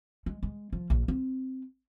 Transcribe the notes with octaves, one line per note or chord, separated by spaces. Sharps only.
G#3
G#3
F3
A#1
C4